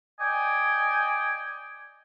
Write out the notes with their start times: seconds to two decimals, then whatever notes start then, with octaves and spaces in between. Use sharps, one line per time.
0.20 D5 D#5 G5 G#5